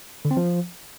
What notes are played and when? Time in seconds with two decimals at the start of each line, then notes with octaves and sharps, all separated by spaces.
0.25 D3
0.31 C4
0.37 F3